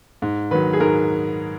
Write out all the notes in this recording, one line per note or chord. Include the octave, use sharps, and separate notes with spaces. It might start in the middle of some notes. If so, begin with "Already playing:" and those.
G#2
D#3 F#3 B4
G#4
G#2 A#4